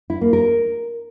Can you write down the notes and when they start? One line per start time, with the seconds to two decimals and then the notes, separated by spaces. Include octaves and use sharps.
0.10 E4
0.21 A#3
0.33 A#4